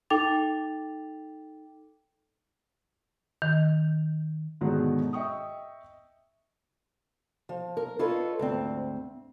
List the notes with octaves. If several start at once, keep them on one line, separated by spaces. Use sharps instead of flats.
D#4 A4 G5 D6 A6 F7
D#3
G#2 B2 D3 D#3 F#3 G#3
D#5 E5 G5 C#6 D#6
F3
A#4
F4 A4 B4 C#5 D#5
D2 G#2 C4